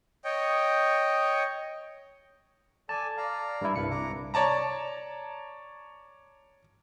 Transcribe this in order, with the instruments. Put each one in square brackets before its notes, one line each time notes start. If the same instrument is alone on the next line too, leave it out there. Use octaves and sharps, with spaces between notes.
[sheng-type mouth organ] C#5 D#5 G5
[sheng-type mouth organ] A4 D5 G#5 [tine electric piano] A5
[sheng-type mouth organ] D5 F5 A#5
[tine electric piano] G2 E4
[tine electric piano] C2 C#7 [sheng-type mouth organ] B4 B5
[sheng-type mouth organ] D4 A#5 D6
[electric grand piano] C#5 D5 A5 A#5